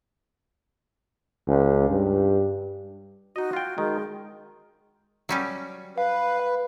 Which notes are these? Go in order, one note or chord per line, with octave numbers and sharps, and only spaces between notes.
C#2
G2
D#4 F#4 D#5
F4 G5
D#3 G#3
F#3 G3 C#4
B4 F5